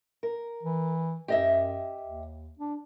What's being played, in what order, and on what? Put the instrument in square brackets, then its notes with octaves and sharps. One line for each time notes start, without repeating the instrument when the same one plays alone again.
[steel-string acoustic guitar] A#4
[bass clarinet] E3
[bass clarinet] F#2 [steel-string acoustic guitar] G4 D#5 E5
[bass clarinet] D#2
D4